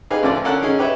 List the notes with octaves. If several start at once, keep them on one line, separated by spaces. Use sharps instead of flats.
D#4 G4 G#4 B4 F5
D2 D3 F3 D5
D3 C#4 A4 A#4 F#5 F#6
C#4 D#4 G#4
D#4 G4 B4 C#5 E5